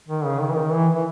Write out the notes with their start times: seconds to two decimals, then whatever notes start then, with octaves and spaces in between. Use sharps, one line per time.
0.08 D#3
0.25 C#3
0.40 D#3
0.51 E3
0.57 D#3
0.73 E3
0.95 E3